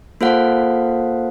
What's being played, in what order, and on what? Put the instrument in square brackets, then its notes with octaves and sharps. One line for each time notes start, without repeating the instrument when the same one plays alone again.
[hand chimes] A#3 F4 A4 C5 F5 F#5